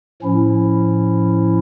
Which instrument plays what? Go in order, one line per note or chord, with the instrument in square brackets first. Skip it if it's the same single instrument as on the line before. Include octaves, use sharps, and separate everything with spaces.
[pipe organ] A2 F3 C#4 E4